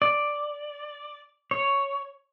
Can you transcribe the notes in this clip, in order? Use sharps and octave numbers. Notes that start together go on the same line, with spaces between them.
D5
C#5